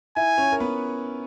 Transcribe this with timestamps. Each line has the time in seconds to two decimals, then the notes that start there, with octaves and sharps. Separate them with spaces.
0.16 E4 E5 G#5
0.38 C#4 C#5
0.52 A#4
0.60 B3 B4